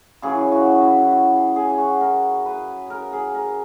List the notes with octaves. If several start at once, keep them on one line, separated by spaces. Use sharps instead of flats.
F#2 C#3 E3 G#4
F#4
F#4
E4
F#4
G#4
G#4
G#4
F#4
A#4
B4
A#4
G#4
A#4